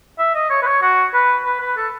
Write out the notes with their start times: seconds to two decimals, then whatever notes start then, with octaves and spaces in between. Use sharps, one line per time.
0.19 E5
0.35 D#5
0.50 C#5
0.62 B4
0.66 C#5
0.82 F#4
1.14 B4
1.45 B4
1.60 B4
1.77 A4